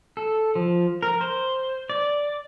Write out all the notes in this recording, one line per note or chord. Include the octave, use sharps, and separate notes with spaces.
A4
F3
A#4
C5
D5